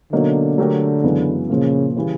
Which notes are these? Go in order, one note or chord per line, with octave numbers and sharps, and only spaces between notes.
B2 D3 F#3 A#3 D#4
F#3 A3 D4 G4 A#4
F#2 C#3 E3 G#3 B3
A#2 C#3 F3 A#3
C#3 E3 G3